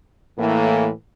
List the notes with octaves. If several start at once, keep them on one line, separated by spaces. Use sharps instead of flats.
A2 E3 A#3